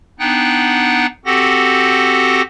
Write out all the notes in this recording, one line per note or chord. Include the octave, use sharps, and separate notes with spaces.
B3 D4 D#4 F#5 G5 F#6
C4 F#4 G4 A4 F#5 A#6